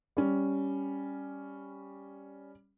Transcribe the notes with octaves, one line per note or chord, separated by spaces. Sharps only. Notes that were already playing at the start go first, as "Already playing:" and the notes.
G3 C#4